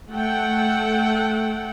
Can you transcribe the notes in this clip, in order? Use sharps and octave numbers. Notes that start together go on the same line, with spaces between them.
A3 A4 F#5 G5